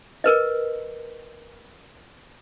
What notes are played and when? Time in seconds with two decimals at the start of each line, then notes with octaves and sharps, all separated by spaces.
0.24 A#4 B4 D#5